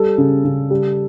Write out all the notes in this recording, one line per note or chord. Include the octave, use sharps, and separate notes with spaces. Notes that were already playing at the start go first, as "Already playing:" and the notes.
Already playing: G3 A4
C#3
C#3
G3